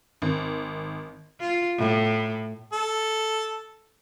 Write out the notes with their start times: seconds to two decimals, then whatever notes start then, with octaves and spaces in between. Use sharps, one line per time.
0.22 G#1
1.40 F4
1.78 A2
2.72 A4